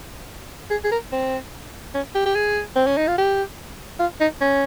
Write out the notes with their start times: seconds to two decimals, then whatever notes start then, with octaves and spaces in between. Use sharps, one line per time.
0.71 G#4
0.84 G#4
0.92 A#4
1.12 C4
1.95 C#4
2.15 G4
2.26 G4
2.35 G#4
2.76 C4
2.87 C#4
2.97 D#4
3.08 F4
3.18 G4
4.00 F4
4.21 D#4
4.41 C#4